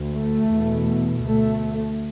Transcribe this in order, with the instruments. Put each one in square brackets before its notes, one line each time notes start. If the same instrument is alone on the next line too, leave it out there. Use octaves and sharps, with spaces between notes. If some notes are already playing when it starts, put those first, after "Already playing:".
Already playing: [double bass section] D2
A3
E2 B2
D2 A3